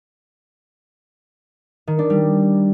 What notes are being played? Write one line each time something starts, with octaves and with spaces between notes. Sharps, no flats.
D#3
D4
G3